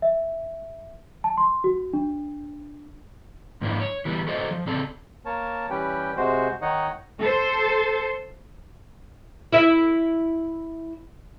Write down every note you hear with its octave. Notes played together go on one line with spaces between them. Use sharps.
E5
A5
C6
F#4
D4
G#2 F3 A#3 D4 E4
C#5
E3 G3 B3
F#4 A4 C5 D5 D#5
F3
C#3 C4 A4 D5 A5
A#3 A#4 C#5 A5
E3 G3 C#4 G4 B4 G5
C3 G#3 F#4 C5
D#3 D#4 C#5 D#5 F#5
A4 C5
E4 E5